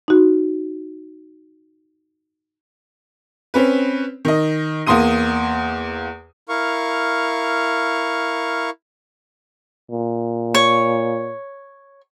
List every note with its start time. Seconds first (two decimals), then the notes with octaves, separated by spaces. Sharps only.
0.08 D#4 F#4
3.54 C4 C#4 B4
4.25 D#3 D#5
4.86 E2 A#3 C6 D#6 D#7
6.49 E4 A#4 F5 C#6
9.92 A#2
10.54 C#5